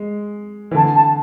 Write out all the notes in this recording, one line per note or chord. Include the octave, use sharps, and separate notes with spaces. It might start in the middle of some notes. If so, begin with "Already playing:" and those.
Already playing: G#3
E3
D3 A5
A5